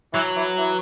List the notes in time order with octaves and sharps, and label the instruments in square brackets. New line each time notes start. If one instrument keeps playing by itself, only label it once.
[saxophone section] E3 [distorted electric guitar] F#3
[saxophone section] E3
E3